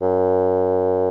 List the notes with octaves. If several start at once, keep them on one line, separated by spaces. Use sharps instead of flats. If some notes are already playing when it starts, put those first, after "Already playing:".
F#2